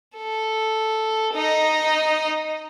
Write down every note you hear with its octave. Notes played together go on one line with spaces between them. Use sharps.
A4
D#4 D#5